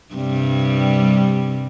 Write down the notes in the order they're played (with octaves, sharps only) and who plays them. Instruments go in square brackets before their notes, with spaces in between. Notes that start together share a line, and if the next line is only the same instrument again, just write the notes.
[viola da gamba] G2 C3 G3